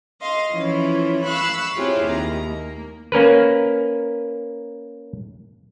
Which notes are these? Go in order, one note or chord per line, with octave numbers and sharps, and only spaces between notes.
D#5 F5 C6
E3 F3 C#4 E4 F4 C#5
F5 B5 C#6 E6 F#6
C4 E4 F4 G4 G#4 C#5
D#2 A#5
A#3
A#3 C#4 A#4 B4